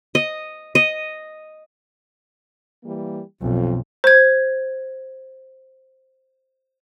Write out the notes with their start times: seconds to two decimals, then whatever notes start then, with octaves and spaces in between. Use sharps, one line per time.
0.15 D#5
0.75 D#5
2.84 E3 G3 A#3
3.41 B1 F2
4.04 C5 G#6